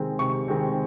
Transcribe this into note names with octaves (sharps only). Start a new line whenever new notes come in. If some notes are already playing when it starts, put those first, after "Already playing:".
Already playing: C3 D#3 G#3 C4
C3 C#6
D#3 G#3 C4